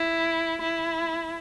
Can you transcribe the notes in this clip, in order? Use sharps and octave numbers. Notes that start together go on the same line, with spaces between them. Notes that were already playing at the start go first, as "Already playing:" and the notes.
Already playing: E4
E4